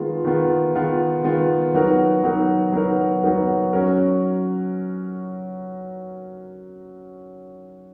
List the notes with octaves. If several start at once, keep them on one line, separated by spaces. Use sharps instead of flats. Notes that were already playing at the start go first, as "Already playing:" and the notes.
Already playing: D#3 G#3 B3 F4
D#3 G#3 B3 F4
D#3 G#3 B3 F4
D#3 G#3 B3 F4
F#3 B3 D#4 F#4 A#4
F#3 B3 D#4 F#4 A#4
F#3 B3 D#4 F#4 A#4
F#3 B3 D#4 F#4 A#4
F#3 C#4 F#4 A#4